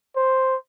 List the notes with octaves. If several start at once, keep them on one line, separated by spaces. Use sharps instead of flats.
C5